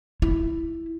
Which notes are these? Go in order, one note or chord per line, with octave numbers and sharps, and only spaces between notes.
E4